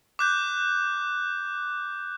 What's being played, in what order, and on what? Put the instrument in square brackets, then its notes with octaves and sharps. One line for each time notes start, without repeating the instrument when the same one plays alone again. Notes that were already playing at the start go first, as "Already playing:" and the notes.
[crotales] D6 F#6 G6